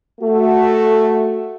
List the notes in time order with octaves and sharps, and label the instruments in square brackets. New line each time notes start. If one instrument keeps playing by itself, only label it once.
[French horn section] A3 F#4